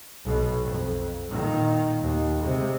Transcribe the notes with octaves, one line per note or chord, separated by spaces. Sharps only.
B1 B2
F2
A#2 D#3
D#2
C3 G#3